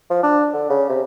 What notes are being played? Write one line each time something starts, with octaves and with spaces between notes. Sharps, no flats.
F3
D4
D3
C#3
C3